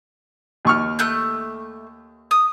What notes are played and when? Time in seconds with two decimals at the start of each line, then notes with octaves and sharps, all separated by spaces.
0.65 D#2 C#6 F6
0.99 A3 F#6 G6
2.31 D#6